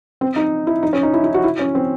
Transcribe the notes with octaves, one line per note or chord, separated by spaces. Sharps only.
C4
D#4
E4
D#4
C#4
D#4
E4
E4
F#4
E4
C#4
C4